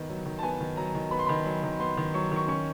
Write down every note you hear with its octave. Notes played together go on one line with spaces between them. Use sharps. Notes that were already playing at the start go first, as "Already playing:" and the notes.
Already playing: D#3 B3
F#3
D#3
A5
B3 G#5
D#3
F#3 A#5
D#3
B3 B5
C6
D#3 B5
F#3
D#3
B3 C6
D#3
F#3 C#6
D#3 C#6
C#4 C#6